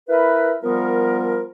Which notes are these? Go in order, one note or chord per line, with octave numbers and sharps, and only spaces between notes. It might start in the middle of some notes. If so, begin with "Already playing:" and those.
E4 A#4 B4
F3 G3 B3 A#4